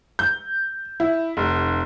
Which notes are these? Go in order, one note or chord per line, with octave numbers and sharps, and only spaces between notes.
G6
E4
F1